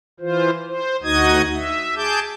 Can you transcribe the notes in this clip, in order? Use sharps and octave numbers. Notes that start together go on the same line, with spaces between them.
E3 F4 C5
C5
D2 D#4 F#4 D#5 D#6 G#6
E5
G#4 A5 D6 G6